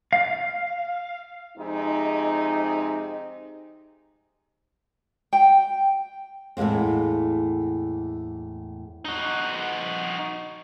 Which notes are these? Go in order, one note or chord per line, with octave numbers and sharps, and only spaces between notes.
F5
F2 C3 G#3 D#4
G5
E2 A2 G#3 A#3 C4
D#4 F#4